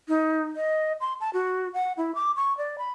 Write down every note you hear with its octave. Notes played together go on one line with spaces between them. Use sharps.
D#4
D#5
C6
A5
F#4
F#5
E4
D6
C#6
D5
B5